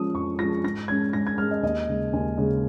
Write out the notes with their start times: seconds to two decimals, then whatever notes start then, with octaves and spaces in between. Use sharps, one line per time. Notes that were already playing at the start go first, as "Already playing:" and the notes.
Already playing: F3 G#3 C#4 D#6
0.15 F2 C#6
0.39 F3 G#3 C#4 A#6
0.64 G#2 A#6
0.88 G#3 C#4 G#6
1.13 G#2 A#6
1.27 G#6
1.38 G#3 C#4 F6
1.51 D#5
1.63 D#2 D#5
1.88 C#3 G#3
2.13 D#2 G#5
2.37 C#3 G#3